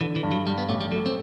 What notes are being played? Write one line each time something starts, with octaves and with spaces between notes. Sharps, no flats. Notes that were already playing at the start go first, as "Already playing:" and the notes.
D3 E3
E3
G2
F#3
G2 G3
B3
A1 A3
G3
F#3 A3
C4